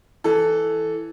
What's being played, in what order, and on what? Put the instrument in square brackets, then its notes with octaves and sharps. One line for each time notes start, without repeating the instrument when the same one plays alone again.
[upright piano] E3 A4